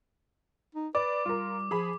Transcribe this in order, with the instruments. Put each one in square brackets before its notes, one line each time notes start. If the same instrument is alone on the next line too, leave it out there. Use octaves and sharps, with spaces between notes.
[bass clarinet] D#4
[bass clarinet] B4 [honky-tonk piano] D5 [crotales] D6
[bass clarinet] G3 [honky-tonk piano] F4 A#4
[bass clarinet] F3 [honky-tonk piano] G#4 B5